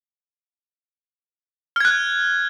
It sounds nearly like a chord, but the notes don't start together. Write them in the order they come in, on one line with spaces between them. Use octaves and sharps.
F6 G#6 F#6